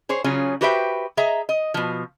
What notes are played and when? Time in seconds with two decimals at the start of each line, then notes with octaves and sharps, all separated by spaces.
0.09 G#4 C5 C#5
0.24 C#3 F#3 C#4 F4 G#4
0.61 F#4 G4 B4 C5 E5 G5
1.17 G#4 D#5 E5 A#5
1.49 D#5
1.74 B2 F3